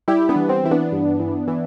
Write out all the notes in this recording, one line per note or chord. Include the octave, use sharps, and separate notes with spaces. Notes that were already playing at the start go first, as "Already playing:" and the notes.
G3 E4 G4
B3 D4
E3
C4
E3 E4
B3 D4
G2
E3
E3